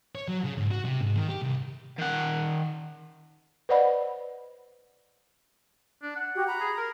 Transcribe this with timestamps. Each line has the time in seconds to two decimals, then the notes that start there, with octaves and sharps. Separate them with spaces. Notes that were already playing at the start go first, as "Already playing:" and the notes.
0.15 C#5
0.28 F#3
0.44 C#3
0.58 G#2
0.71 F#4
0.85 C3
1.01 G#2
1.16 D#3
1.29 G4
1.42 C2
1.99 D#3 F#5
3.69 B4 C5 D5 D#5 F#5 B5
6.03 D4
6.16 F#5
6.35 F#4 G4
6.47 A#5 B5
6.61 G#4
6.78 A#4